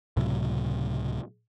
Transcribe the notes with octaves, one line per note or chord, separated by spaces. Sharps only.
C#2 A2 C3 F#3